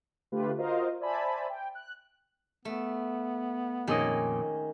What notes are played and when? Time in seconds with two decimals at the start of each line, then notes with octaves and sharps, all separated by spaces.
0.32 D3 A3 F4 G4 B4
0.58 F4 F#4 A#4 C5 D#5 F5
1.00 C5 D5 E5 G#5 A5 B5
1.49 G5
1.75 F#6
2.65 A3 B3
3.88 F2 A#2 D#3 C#4 G#4 D#5